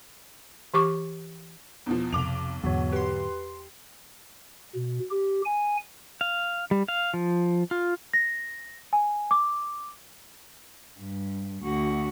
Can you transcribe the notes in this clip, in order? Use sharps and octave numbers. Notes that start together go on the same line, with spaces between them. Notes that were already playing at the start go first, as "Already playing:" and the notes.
E3 G4 C#6 D6
E2 B2 F3
B1 F2 C3 D6 F7
E2 G#2 D3 F#3 B3 F#4 C#5
G4 B4 C6
B2
G4
G#5
F5
G3
F5
F3
F4
A#6
G#5
D6
G2
D2 F#4